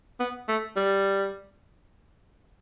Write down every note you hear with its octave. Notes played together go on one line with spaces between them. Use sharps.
B3
A3
G3